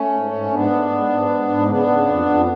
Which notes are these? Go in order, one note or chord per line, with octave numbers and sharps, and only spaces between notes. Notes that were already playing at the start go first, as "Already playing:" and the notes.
Already playing: A3 C#4
G#2
G#2
G#2 B3 D4
G#2
G#2
G#2
G#2
G#2
C#3 B3 D4
C#3
F2
F2